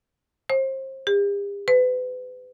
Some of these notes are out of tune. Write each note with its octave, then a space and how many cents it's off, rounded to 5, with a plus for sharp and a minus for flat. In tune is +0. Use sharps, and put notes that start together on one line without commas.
C5 +30
G4 +45
B4 +35